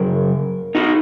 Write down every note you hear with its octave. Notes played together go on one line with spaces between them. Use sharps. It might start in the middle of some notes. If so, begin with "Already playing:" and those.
Already playing: F#2 C#3 F#3 A#4
D#4 F#4